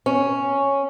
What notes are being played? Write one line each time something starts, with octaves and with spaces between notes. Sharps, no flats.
C#4